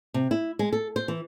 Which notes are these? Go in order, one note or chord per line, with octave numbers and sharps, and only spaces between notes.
C3
E4
G#3
A4
C5
E3